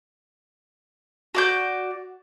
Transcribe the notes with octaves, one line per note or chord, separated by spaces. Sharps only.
F#4 D5 G6